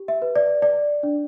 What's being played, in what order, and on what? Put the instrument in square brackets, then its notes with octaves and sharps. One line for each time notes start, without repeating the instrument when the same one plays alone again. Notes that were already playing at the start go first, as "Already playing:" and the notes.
Already playing: [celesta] G4
E5
B4
D5
D5
D4